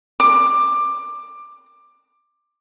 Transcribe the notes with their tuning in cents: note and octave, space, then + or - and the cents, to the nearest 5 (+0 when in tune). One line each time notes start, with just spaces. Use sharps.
D6 +15